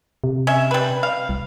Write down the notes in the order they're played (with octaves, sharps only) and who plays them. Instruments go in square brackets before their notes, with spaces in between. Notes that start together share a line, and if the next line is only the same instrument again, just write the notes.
[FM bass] C3
[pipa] C#4 E5
G3 B4
F5
[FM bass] C2